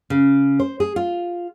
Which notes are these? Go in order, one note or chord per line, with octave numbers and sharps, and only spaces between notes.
C#3
C5
G#4
F4